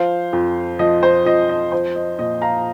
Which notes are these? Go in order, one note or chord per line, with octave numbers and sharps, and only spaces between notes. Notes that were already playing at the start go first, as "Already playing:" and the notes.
Already playing: F3 C5 F5
F2
F3 D#5
C5
F2 D#5
D#5
F3 C5
D#5
A#2 D#5
F5 A#5